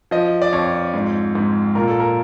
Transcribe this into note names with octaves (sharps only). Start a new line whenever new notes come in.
F3 D#5
D5
F2 C#5
G#2
G#2
A#2 A#4
A4
A#4